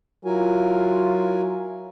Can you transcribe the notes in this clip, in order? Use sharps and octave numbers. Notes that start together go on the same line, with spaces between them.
F#3 E4 F4 A#4 G#5